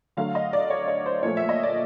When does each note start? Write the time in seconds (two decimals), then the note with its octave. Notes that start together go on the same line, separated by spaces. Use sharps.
0.17 D3 F#3 A3 F5
0.35 D#5
0.53 D5
0.70 C#5
0.88 C#5
1.06 C5
1.23 A#2 F3 A3 C#5
1.37 E5
1.49 D#5
1.63 D5